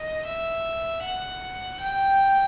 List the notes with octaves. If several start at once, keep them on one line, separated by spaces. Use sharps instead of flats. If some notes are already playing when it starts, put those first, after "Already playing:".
Already playing: D#5
E5
F#5
G5